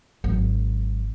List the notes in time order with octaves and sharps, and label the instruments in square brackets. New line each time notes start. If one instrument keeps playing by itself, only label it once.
[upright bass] G#1 F#3